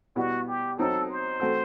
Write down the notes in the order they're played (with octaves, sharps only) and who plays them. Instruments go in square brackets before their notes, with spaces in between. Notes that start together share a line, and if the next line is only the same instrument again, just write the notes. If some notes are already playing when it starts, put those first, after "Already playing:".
[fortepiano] B2 G3 B3 E4 [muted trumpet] F#4
[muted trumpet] G4
[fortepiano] F#3 C4 D#4 [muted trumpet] A4
[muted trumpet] C5
[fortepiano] A3 C4 F#4 A4